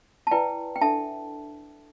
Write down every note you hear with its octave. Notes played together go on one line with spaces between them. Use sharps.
A5
E4 B4 D5 G5
G5
D4 A4 E5 A5